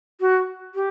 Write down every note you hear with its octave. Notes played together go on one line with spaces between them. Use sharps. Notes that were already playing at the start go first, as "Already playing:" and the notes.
F#4
G4